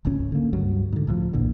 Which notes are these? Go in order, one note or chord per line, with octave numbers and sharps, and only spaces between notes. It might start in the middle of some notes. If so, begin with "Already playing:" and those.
D1 G#1 C#2 C#4
D3 A#3
C#2 G2 F#3
G#2 D3
C#2 A2 F3
A#1 E2 A#2 D3